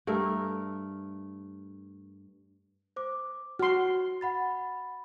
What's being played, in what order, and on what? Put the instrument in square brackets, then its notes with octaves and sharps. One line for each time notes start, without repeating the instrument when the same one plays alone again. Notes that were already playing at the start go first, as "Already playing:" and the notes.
[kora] G2 A3 A#4
[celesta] C5 D6
[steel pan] F#4 C6 [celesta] F6
[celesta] F#5 B5 A6